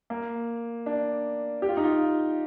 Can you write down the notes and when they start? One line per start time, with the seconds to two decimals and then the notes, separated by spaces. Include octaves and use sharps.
0.10 A#3
0.86 D4
1.62 G4
1.69 F4
1.77 D#4
1.84 F4